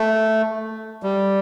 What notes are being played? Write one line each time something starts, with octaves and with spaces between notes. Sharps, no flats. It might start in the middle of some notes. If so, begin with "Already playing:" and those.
Already playing: A3
G3